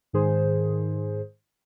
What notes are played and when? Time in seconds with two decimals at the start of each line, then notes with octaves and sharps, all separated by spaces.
0.13 G#2 D#3 G#4 C5